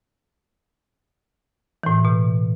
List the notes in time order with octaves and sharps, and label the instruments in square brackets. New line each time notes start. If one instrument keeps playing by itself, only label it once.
[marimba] A2 E3
B2